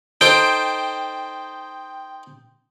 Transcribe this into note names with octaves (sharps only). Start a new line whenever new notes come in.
D#4 A4 C5 G5